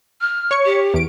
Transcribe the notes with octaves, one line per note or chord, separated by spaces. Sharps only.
F6
C#5 C#6 C#7
G4
E2 D7